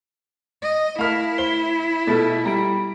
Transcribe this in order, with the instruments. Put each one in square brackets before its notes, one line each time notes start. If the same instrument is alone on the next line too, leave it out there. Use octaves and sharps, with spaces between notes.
[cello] D#5
[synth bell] A3 A#4 [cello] E4 [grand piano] F5 F6
[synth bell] C5 [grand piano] G7
[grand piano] B2 A3 [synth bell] F4 A4
[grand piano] G3 [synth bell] A#5 D7